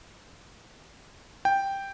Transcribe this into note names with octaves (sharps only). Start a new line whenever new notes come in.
G5